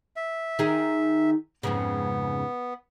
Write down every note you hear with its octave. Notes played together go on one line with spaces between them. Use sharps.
E5
D#3 D#4 G#4
F2 G#2 C#3 B3